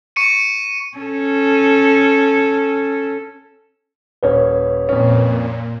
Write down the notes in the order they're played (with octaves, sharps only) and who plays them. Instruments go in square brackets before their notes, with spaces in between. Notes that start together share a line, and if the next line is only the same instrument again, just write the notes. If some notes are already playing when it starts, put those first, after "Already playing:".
[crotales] C#6 C#7 D#7
[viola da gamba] C#4 A4
[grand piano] D#1 C#4 [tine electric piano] B4 C#5
[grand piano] F2 C#4 [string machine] A#2